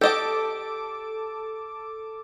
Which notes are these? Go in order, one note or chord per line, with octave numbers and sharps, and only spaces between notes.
G4 A4 D#5 G5 D6